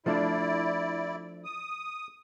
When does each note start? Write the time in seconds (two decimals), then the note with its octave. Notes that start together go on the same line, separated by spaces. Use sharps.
0.06 F3 A3 D4 E4 D5
1.44 D#6